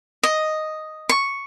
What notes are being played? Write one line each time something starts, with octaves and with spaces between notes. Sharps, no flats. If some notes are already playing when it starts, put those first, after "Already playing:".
D#5
C#6